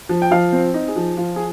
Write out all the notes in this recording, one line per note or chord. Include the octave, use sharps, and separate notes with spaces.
F3
G5
F3 F5
C4
D#4
G#4
F3
F3 F4
G#4